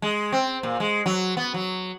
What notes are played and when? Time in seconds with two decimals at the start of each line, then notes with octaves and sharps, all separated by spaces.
0.02 G#3
0.32 C4
0.63 A#2
0.80 G#3
1.06 F#3
1.37 B3
1.54 F#3